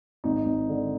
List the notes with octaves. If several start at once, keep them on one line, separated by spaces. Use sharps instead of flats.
G#1 D#4
G#1
D3